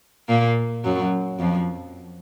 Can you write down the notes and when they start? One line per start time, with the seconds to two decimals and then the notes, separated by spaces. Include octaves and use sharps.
0.29 A#2 A#3
0.84 F#2 F#3
1.39 F2 F3